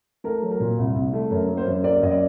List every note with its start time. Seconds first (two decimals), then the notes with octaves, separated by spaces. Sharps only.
0.24 A3 A#4
0.42 F#3
0.51 A#4
0.60 A#2
0.78 C2
0.95 C2
1.13 A3
1.30 F#2 A#4
1.49 A#3
1.57 C5
1.66 F#2
1.84 A#3 D5
2.02 F#2 D#5
2.11 D5